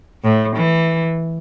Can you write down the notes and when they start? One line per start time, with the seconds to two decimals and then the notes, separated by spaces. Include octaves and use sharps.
0.23 A2
0.56 E3